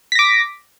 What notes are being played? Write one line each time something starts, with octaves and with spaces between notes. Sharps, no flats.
D6 A#6 B6